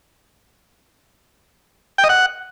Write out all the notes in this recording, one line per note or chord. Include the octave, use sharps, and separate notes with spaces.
G5
D#5
F#5